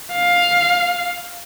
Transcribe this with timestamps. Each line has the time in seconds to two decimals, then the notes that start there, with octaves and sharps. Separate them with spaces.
0.13 F5